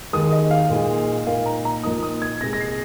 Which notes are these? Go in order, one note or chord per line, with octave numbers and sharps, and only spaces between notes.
D#2 D#3 G#3 D#6
D#5
F5
A#2 G#3 D#4
A#2 A#3 D#4 F5
A#5
A#5
A#2 F3 A#3 D#4 D#6
D#6
G#6
C2 A#2 G#3 A#6
A#6
C7